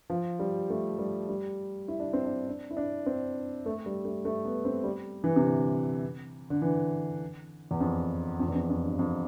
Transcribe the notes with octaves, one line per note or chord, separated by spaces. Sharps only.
F3
G3
A3
G3
G3
E4
D4
C4
D4
D4
E4
D4
C4
A3
G3
A3
A3
B3
C4
G3
E3
C3
D3
D3
E3
E2
F2
F2
E2
F2
F2
G2
F2